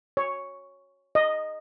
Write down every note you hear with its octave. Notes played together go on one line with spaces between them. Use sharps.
C#5
D#5